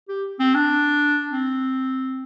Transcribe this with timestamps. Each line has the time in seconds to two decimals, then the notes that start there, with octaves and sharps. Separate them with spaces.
0.09 G4
0.39 C4
0.55 D4
1.31 C4